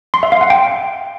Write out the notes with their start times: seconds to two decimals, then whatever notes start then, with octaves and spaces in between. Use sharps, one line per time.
0.14 C6
0.23 E5
0.32 F5
0.41 F#5
0.50 G5